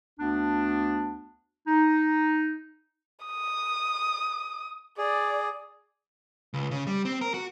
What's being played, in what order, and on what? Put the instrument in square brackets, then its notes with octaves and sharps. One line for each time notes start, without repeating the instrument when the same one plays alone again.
[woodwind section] D2 B3 D4
D#4
[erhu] D#6
[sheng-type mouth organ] G#4 [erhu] D5
[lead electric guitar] C#2
C#3
G3
C4
A#4
F#4